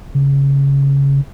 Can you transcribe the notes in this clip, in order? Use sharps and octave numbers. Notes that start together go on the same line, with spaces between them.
C#3